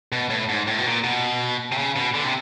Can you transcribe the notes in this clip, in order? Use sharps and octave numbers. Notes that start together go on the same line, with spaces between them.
B2
A2
G#2
A2
B2
A#2
B2
C3
C#3
B2
D3
C3